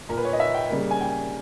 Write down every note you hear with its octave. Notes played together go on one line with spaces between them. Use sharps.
A#2 A#3 A#4 B4
C#5
D#5
E5
G5
C#3 G3 A#3
G#5
G5